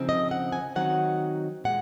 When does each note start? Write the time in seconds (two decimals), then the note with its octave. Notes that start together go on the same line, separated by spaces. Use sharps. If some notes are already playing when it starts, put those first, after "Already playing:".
Already playing: C#3 F3 C4 D#4
0.09 D#5
0.31 F#5
0.52 G#5
0.75 D#3 F#3 C4 D#4 F#5
1.64 A#2 G#3 F#5